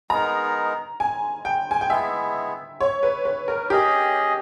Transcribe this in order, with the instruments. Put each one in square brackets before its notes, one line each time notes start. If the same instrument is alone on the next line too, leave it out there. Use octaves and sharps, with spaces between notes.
[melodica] G#3 B3 D#4 A#4 [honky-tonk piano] A#5
[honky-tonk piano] G#5
G5
G#5
G5
[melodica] G#3 B3 E4 [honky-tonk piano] E5
[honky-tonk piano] C#5
B4
B4
A#4
[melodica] C#4 G#4 D#5 [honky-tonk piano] G4